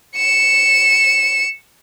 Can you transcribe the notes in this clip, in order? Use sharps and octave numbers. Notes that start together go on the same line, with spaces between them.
C#7 E7